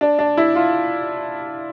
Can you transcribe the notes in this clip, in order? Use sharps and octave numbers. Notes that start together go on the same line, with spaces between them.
D4
D4
E4
F4